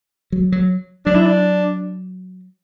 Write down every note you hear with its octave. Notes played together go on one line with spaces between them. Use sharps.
F#3
F#3
F#3 D4
E4
D4